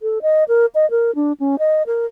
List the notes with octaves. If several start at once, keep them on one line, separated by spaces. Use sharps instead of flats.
A4
D#5
A#4
D#5
A#4
D4
C#4
D#5
A#4